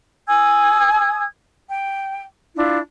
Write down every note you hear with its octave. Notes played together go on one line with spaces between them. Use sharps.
G#5 D#6 E6 G#6
G5
D4 E4 F4